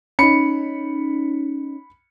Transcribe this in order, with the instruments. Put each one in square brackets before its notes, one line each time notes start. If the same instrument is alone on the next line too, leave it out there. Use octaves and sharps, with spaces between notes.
[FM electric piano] C#4 D#4 [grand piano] B5 C#7